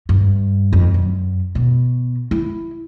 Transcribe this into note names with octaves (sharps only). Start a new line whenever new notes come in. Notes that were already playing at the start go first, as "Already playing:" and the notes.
G2
F2
F#2
B2
E4